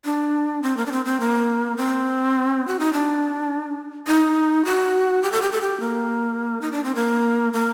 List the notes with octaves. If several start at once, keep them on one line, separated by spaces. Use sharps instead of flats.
D4
C4
A#3
D4
C4
C4
A#3
C4
F#4
D#4
D4
D#4
F#4
G4
A4
G4
A4
G4
A#3
D#4
D4
C4
A#3
A#3